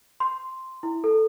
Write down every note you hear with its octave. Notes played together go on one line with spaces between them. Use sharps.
C6
E4
A4